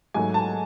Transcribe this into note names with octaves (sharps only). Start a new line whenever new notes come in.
G#2 F#3 A3 G#5
A5